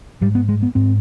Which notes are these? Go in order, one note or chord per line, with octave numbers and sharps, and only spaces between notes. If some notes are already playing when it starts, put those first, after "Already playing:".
G#2 G3
B3
G#3
B3
G#2 C4